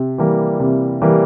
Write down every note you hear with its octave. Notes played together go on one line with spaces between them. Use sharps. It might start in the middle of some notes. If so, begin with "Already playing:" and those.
Already playing: C3
E3 G3 A#3
C3
E3 G3 A#3